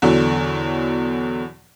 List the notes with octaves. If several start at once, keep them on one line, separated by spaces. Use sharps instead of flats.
E2 B2 D3 F#3